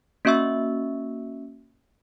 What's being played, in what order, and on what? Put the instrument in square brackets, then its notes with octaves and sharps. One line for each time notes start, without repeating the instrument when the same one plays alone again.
[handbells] A#3 C#4 F#4 E5 C#6 E6